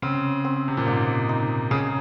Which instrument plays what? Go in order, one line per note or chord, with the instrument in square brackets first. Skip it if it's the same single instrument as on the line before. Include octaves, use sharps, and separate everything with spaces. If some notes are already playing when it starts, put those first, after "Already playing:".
[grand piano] C#3 [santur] C4
[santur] C4
[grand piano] C3
A#2
[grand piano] G#2 [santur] D#5
[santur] D#4
[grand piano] C#3 [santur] G#4